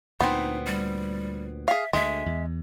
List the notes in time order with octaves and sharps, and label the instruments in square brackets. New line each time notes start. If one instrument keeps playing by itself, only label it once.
[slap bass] D2 A#2 [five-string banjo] B3 C4 [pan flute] D#4
[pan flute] G3
[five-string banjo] G#4 F5 [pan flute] E5
[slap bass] D2 D3 [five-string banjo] G#3 [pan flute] E5
[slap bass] E2